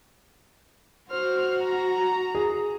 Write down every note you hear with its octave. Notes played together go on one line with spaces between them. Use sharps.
F#4 C5 F6
A#5
G#4